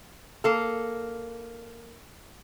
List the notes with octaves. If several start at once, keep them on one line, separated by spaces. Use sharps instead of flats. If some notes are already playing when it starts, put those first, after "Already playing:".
A#3 A4